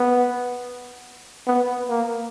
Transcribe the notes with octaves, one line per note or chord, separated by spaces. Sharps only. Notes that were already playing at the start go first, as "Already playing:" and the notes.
Already playing: B3
B3
A#3